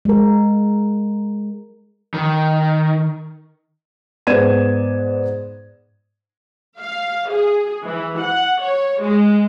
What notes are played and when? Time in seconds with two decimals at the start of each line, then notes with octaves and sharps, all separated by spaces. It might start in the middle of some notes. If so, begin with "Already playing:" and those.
0.05 G#3 A#4
2.14 D#3
4.27 G#2 B3 D5 G#6 D#7 E7
6.80 F5
7.30 G#4
7.84 E3
8.20 F#5
8.61 C#5
9.02 G#3